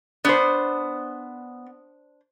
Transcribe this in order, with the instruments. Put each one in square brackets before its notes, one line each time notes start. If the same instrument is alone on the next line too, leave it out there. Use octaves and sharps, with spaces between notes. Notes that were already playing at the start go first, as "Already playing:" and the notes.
[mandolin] B3 [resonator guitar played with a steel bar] D4 C5